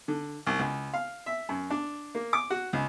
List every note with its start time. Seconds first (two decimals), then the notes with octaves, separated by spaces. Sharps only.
0.08 D3
0.47 C2
0.59 C#2
0.94 F5
1.26 E5
1.49 F#2
1.70 D4
2.15 A#3
2.33 D6
2.50 F#4
2.73 C#2